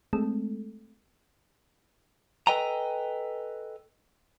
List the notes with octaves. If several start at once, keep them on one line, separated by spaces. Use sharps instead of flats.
G#3 A3 C4 A4
A4 B4 D#5 G5 G#5 A#5